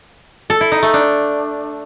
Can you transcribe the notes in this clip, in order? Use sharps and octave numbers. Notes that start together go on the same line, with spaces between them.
A4
E4
D#4
A3
D4